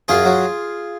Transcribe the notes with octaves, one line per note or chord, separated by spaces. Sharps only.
F#2 F4 G#4
F#3